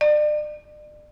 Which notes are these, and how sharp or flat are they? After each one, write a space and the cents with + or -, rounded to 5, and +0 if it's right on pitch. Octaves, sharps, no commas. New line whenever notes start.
D5 +40